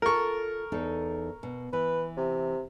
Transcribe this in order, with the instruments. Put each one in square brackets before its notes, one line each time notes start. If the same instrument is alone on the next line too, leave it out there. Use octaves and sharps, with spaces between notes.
[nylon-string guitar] F4 A4 [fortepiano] A#4 C#6
[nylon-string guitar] E2 D#4 A4
B2
[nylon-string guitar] E3 [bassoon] B4
[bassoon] C3